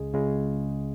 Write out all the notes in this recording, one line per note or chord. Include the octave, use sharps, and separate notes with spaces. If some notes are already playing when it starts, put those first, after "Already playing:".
Already playing: C#2 C#3 G#3 G#4
C#2 C#3 G#3